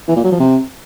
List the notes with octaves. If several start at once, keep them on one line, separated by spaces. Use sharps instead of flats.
E3
A#2
F#3
F3
C3